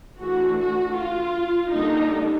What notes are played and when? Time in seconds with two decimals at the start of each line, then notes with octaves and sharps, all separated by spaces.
0.19 E3 A3 D4 F#4
0.58 F#4
0.97 F4
1.72 D3 G3 A#3 D4 D#4